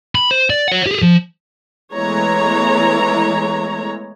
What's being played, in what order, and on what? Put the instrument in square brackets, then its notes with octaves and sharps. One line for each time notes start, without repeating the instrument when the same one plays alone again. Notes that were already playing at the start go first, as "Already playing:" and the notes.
[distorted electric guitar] B5
C5
D5
C#5 F#5
G4 G#4
F3
[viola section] E3 G#3 A3 B3 C#5 A#5